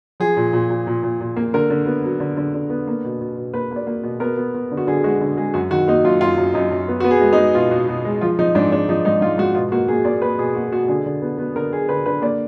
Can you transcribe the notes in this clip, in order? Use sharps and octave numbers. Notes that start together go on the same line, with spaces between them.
F3 G#4
A#2
A#2
A#2
A#2
A#2
A#2
A#3
D3 A#4
D3
B3
F#3
D3
D3
D3
B3
A#3
B2
B2
B2
A#3 B4
A#3 D5
A#3
B2
B3 A#4
B3
B3
D3
F#4
D3 G#4
G#3 F#4
D3
G#3 G#4
F#2 F#4
D#3 F#4
A#3 D#4
F#2 F4
F#2 F4
F#2
F#2 D#4
F#2
B3
B3 F#4
G#4
G#3
D#4
G#3
B2 F4
B2
B2
G#3
F3 F4
F3 D#4
G#2 D4
G#2 D4
F3 D#4
G#2 D#4
G#2 F4
G#2 F#4
B2 F4
A#3 F#4
A#3 G#4
A#3 D5
A#3 B4
B2 G#4
A#3 F#4
B2 F#4
D3 G#4
D3
B3
B3
D3 A#4
F#3 G#4
D3 B4
D3 B4
A#3 D5